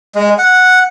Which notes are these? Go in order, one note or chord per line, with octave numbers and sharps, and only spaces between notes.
G#3
F#5